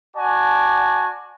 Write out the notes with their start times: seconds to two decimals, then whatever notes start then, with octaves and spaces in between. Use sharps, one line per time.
0.16 F#4 D5 G#5 A5